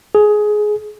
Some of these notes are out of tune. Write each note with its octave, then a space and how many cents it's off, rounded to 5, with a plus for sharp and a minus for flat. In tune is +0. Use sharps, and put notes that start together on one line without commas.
G#4 +15